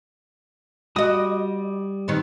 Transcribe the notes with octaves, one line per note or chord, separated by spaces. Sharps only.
G3 F#4 D#5 D#6
D#3 B3 C4